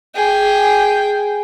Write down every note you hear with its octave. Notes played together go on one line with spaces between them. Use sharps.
G#4 G5